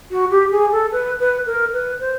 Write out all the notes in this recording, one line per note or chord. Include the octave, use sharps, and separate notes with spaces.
F#4
G4
G#4
A4
B4
B4
A#4
B4
C5